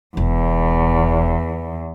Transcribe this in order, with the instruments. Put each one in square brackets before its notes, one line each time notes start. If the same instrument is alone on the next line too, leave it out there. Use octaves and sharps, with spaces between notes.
[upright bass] E1 [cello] E2